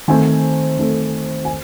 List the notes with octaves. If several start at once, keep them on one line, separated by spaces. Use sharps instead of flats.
D#3 A3 C4 G#5
D#3 A3 C4
G#5